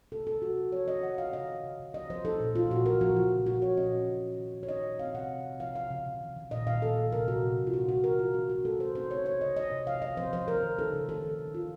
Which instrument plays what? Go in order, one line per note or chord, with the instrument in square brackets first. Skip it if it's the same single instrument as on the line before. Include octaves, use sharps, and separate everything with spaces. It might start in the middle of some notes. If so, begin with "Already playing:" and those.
[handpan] C3 A4
C3 A4
F3 F#4
F3
F3 C#5
F3 D#5
D#3 F#5
D#3 F5
C#3 D#5
C#3
C#3
C#3
F3 D#5
F3 C5
D#4 A4
A#2
A#2 F4
A#2 F#4
F3 A#4
F3 F#4
C#3 F4
C#3
A#2 F#4
A#2 C#5
C#4 D#5
A#2
C#3
C#3
D#3
D#3
C#5
D#4 D#5
A#2
C4 F5
C3 F#5
C4
C3
F3 F5
F3 F5
C#3
C#3
D#3
D#3
A#2 D#5
A#2 F5
F3 A4
F3
C3 A#4
C3 F#4
A#2
A#2
F4
D#4 F#4
D#3 F#4
D#3 A#4
D#3 F4
C#4 F#4
D#3 F#4
A3 A4
C3 C5
D#4 C5
C#3 C#5
C#3 C#5
C#3 D#5
D#4 D#5
C3
F3 F5
F3 D#5
F3 C5
F3 C5
D#3 A#4
D#3
D#4 A4
C#3
D#3 A4
D#3
C#3
C#3 F4